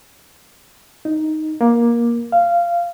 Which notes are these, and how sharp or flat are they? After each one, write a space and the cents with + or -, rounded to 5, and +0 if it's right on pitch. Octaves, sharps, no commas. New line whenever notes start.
D#4 +0
A#3 +15
F5 -15